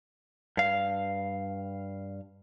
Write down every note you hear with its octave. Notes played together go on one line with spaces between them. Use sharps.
G2 F5